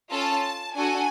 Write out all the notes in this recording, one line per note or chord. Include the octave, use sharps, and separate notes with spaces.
C#4 F4 A4 A5
D4 F#4 A4 G#5